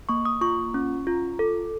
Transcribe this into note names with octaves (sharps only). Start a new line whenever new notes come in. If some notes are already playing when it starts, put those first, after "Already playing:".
A#3 C#6
D#6
F4 C#6
C#4
F4
A4